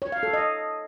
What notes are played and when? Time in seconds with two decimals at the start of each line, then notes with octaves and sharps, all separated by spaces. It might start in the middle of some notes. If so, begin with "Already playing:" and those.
0.02 C#5
0.12 F5
0.23 A4
0.33 D#5